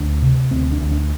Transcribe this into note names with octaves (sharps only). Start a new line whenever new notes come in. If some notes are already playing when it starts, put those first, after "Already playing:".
Already playing: D2 D4
C3
D2 C4
D4
D2
D4